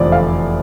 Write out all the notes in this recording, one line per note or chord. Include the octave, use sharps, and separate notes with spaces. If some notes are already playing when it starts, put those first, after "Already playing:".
Already playing: F1 E2 D3 F3 D5
F5